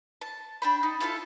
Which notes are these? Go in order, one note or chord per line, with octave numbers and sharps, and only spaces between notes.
A5
D4 G5 B5
D#4
E4 F4 A4 A5